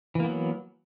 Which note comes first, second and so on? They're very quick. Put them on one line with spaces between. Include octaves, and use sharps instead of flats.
E3 A#3 B3 F#3